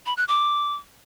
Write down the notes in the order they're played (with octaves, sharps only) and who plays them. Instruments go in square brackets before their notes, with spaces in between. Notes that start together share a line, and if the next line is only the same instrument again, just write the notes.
[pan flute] B5
F#6
D6